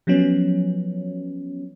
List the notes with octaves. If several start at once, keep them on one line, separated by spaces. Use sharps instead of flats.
F3 F#3 B3 C#4